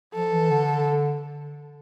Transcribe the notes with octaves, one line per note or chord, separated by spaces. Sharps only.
F3 A4
E3
D3